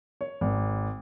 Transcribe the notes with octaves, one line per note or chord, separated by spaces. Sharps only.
C#5
G#1